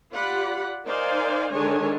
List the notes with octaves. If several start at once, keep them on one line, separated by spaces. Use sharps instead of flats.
F4 G4 D5 F#5 B5
D#4 A#4 C5 D5 F5 G#5
D3 D#3 G#3 D4 C#5 G#5